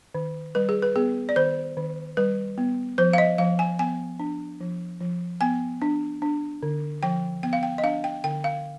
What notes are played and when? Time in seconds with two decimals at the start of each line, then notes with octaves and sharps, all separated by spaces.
0.14 D#3
0.55 G3 B4
0.69 G#4
0.82 B4
0.96 B3 G#4
1.29 D5
1.36 D#3 C5
1.77 D#3
2.17 G3 B4
2.58 B3
2.98 F3 C5
3.13 F5
3.18 D#5
3.38 F3 F5
3.59 G#5
3.79 B3 G#5
4.19 D4
4.61 F3
5.01 F3
5.41 B3 G#5
5.82 D4
6.22 D4
6.63 D3
7.03 F3 G5
7.43 B3 G5
7.53 F5
7.63 G5
7.78 D#5
7.83 D4 F5
8.04 G5
8.24 D3 G5
8.44 F5